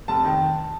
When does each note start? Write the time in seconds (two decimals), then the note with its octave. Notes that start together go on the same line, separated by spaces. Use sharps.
0.08 F1 A5
0.25 D#3